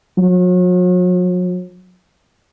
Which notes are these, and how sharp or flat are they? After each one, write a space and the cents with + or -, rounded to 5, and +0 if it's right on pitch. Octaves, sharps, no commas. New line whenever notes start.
F#3 -40